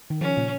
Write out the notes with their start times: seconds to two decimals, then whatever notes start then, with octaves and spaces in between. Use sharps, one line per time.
0.10 D#3
0.21 C#3 F3 C#4
0.37 A#2 C#3